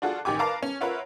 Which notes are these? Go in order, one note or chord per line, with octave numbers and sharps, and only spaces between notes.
D4 F4 F#4 G#4 A4
A1 D#3 G4 G#5 D6
A#4 B4 F5 A5 A#5 D6
C#4
F4 A#4 B4 C#5 E5 F#5